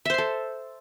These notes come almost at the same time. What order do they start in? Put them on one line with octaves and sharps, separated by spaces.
E5 C5 C6 A4